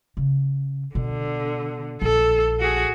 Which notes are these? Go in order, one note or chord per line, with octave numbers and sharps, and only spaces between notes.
C#3
B2 D3
A#1 A4
F#4 G#4